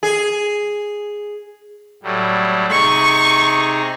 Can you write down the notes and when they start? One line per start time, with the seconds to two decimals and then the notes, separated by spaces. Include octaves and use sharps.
0.03 G#4
2.03 A2 F#3 G3
2.71 C3 D#4 G#4 C#6